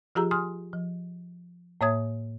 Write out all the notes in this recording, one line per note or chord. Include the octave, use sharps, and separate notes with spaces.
F3 F4 G4 G#4 A#5 E6
G#5 C6 D#6 F6
F3
A2 A#3 C#5 E5 D#6 G#6